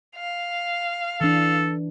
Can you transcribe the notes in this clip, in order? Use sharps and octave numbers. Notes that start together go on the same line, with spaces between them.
F5
E3 D4 A4